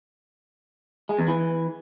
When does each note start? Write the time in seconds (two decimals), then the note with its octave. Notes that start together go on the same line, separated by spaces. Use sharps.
1.09 G#3
1.19 E2
1.28 E3